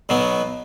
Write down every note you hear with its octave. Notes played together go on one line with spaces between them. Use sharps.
B1 B2 F#3 B3